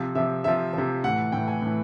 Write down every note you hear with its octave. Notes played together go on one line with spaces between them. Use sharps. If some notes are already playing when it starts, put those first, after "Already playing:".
Already playing: C3 F3
C3 F3 E5
C3 F3 E5
C3 F3
A2 E3 F#5
A2 E3 G5
G#5
A2 E3